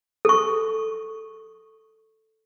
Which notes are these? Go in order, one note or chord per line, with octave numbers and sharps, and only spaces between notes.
A4 C#6